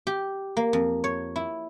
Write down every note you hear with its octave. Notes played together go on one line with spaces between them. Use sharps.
G4
A#3
F2
C#5
E4